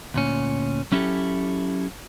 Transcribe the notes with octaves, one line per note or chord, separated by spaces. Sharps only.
D2 A#2 C#4
F#3 C#4 E4 F#4 G4 A4